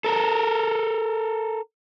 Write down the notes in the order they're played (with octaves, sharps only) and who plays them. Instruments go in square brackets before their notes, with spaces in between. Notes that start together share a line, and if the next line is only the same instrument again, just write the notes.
[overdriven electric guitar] A4 A#4